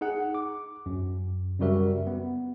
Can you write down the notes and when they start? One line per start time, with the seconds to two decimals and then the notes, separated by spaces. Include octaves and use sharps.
0.01 D#4 G#4 F#5
0.35 D6
0.86 F#2
1.60 F#2 C#3 G3 F#4 A#4 E5
2.07 B3